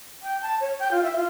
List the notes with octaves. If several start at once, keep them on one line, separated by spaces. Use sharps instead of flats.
G5
A5
C#5
G5
F4
E5
F4